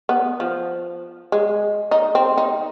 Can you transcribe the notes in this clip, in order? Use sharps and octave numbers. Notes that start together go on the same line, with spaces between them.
B3
F3
G#3
D#4
C4
D#4